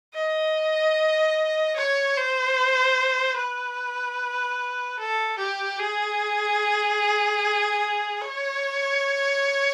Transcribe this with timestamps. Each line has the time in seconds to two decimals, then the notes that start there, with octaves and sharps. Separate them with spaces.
0.15 D#5
1.76 C#5
2.17 C5
3.37 B4
4.99 A4
5.39 G4
5.79 G#4
8.21 C#5